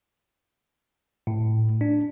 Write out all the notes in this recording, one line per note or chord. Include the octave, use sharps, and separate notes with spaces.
A2
D4